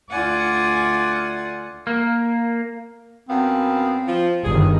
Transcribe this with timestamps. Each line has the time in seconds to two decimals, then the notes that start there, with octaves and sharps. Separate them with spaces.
0.11 D2 F4 D5 F#5 G#5
1.87 A#3
3.29 F#2 B3 C4 F5
4.07 F3
4.44 G1 G2 D#3 G#4